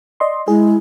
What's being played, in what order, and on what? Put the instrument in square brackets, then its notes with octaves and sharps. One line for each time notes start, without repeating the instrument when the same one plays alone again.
[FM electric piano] D5 D#5 C6
[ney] G#3 [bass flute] E4 [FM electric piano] G#4